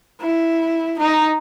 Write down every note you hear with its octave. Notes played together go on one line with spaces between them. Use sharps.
E4
D#4